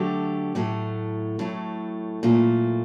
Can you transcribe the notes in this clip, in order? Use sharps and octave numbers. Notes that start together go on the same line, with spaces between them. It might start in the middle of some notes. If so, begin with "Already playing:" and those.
Already playing: D3 F#3 A3 G4
A2 F#3 A3
A2 F#3 A3
A#2 F#3 A3